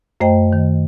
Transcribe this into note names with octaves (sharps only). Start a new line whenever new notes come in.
F#2 A3 C5 D#5 G5
D#3